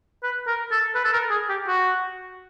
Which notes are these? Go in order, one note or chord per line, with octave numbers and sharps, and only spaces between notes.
B4
A#4
A4
B4
A4
A#4
G#4
G4
F#4